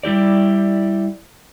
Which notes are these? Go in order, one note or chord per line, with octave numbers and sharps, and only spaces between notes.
G3 E4 G4 D5